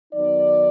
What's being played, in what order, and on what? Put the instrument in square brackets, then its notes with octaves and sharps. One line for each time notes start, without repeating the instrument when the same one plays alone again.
[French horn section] D#3 F#3 B3 D#4 D5